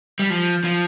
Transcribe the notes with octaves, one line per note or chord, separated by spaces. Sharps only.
G3
F3
F3